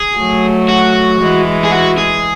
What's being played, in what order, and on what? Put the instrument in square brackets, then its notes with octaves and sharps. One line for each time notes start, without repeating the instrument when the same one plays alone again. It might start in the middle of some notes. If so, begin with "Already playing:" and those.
Already playing: [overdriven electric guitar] G#4
[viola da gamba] F#3 A3
[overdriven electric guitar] F#4
[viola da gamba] E3 G#3
[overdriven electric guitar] G#4
F#4
G#4